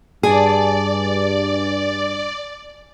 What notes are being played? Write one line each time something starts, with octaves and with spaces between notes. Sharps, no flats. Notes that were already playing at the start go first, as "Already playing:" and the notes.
G2 G#4 D5 G#5 A5